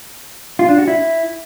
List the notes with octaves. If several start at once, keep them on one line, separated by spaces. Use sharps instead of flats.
F4
D4
F#4
E4